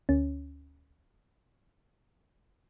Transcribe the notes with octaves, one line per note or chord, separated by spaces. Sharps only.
D2 C#4